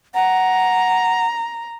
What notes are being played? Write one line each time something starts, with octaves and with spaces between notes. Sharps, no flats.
F#5 A#5